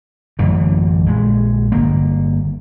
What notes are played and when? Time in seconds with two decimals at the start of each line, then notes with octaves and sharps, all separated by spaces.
0.39 A1 F#2 D3 E3
1.06 A#1 G#3
1.72 G1 A#3